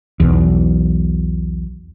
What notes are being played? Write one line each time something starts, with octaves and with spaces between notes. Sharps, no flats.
B1 E2